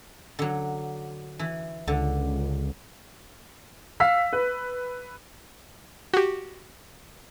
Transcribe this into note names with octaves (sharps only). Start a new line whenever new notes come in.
D3 F#3
E3
C#2 D3
F5 E6 B6
B4
F#4 G4